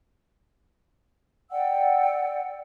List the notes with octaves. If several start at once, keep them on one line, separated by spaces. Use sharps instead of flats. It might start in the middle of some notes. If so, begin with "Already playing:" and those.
D5 F#5 G5 E6